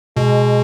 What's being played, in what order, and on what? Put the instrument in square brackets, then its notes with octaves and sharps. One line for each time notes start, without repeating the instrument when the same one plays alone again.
[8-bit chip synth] B2 [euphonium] G#3